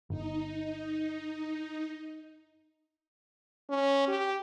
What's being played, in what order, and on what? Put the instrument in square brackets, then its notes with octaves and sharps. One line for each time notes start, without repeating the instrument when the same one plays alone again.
[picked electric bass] G1 [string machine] D#4
[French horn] C#4
G4